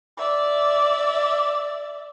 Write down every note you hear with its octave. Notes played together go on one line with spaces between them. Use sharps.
D5 E5